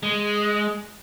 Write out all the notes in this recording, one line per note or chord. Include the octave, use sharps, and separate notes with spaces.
G#3